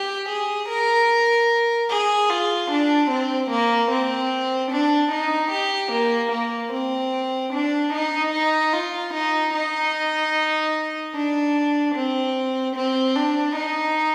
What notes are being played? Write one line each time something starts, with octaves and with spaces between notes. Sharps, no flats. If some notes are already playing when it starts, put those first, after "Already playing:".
Already playing: G4
G#4
A#4
G#4
F4
D4
C4
A#3
C4
D4
D#4
G4
A#3
A#3
C4
D4
D#4
D#4
F4
D#4
D#4
D4
C4
C4
D4
D#4